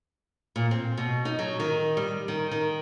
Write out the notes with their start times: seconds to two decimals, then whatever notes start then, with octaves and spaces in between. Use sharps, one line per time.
0.56 A#2
0.71 C4
0.97 B2
1.25 D#4
1.39 F#3
1.60 D#3
1.97 G3
2.28 D#3
2.51 D#3